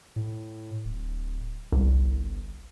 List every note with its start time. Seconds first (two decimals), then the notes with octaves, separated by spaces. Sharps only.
0.16 A2
0.85 D1
1.72 G1 C2